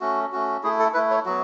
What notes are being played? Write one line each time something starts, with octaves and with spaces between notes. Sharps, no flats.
A3 C#4 F#4
A3 C#4 F#4
A3 E4 G#4
A4
A3 E4 B4
C#5
F#3 B3 F#4